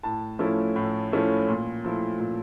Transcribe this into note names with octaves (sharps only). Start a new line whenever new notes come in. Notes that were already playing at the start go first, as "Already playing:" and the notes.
A2 A5
F3 A3 C#4 E4
A2
F3 A3 C#4 E4
A#2
F3 A3 E4
A#2